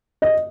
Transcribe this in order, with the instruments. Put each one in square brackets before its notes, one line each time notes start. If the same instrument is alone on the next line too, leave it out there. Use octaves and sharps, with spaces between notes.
[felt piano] D#5